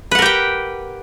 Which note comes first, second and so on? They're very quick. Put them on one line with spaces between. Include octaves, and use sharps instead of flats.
B4 F#5 A#4 G4 G5